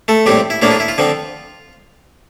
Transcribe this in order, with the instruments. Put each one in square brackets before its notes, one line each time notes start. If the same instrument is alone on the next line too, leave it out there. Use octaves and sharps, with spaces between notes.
[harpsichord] A3 A4
A#1 A2 G3 C4 G4
E4
A#1 A2 F3 A#3 D4 E4
F4
E4
F4
D3 F3 C4